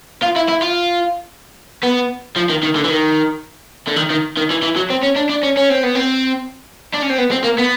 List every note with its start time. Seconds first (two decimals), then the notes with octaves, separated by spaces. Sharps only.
0.22 F4
0.36 E4
0.48 E4
0.62 F4
1.83 B3
2.36 F3
2.49 D#3
2.63 D#3
2.76 D3
2.85 E3
2.90 D#3
3.87 D3
3.96 D#3
4.11 D#3
4.37 D#3
4.51 E3
4.63 E3
4.76 F#3
4.90 C4
5.03 C#4
5.16 D4
5.30 D4
5.43 C#4
5.57 C#4
5.70 C4
5.83 B3
5.95 C4
6.94 D4
7.02 C#4
7.09 C4
7.18 B3
7.31 C4
7.44 A#3
7.58 B3